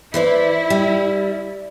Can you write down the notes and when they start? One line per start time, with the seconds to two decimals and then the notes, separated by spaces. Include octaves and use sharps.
0.14 E3 E4 C5 D5
0.70 G3